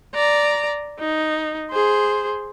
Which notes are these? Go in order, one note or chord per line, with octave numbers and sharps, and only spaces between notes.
D5 A#5
D#4
G#4 C5